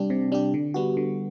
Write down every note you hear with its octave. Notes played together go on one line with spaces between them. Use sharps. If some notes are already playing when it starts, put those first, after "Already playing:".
Already playing: C3 G3 D4 G4
C3
G3 D4 G4
D3
G3 B3 F#4
D3